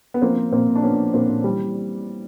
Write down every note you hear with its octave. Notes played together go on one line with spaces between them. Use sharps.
B3
F3 A#3 C4
F3
A#2 A#3 C4
A#2
D4
F3 B3 C#4
F3
A#2 A#3 C4
A#2
E3 G3
E3